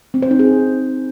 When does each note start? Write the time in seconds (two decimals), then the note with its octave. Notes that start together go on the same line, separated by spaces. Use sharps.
0.14 C4
0.22 C5
0.31 D#4
0.39 G#4